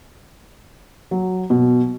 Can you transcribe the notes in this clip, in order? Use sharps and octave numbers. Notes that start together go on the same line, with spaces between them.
F#3
B2